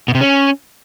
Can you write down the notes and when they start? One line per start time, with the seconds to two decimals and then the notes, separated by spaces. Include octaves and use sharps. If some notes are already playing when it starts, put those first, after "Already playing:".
0.08 B2
0.15 C3
0.21 C#4